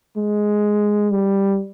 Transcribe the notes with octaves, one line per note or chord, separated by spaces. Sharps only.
G#3
G3